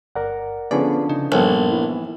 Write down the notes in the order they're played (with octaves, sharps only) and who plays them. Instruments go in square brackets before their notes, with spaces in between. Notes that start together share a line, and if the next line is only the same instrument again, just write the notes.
[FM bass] G1 [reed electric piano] A#4 D5 F#5
[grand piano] D3 F3 C#4 [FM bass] B3 [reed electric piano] G#4 B4 D5
[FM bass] C#3 [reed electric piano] D#4
[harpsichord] A#1 [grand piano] G2 A4 C#5 [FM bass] B3
[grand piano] E3